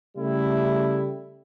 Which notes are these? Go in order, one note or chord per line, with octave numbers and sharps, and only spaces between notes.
C#3 G3 A3 E4